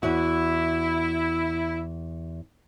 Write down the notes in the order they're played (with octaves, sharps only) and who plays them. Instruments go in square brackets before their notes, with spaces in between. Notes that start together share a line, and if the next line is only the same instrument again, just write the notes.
[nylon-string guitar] E2 F#4 [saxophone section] E4